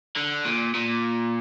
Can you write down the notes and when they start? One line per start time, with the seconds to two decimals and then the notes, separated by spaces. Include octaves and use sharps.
0.16 D3
0.45 A#2
0.75 A#2